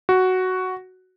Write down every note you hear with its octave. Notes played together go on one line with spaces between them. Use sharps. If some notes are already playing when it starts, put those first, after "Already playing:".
F#4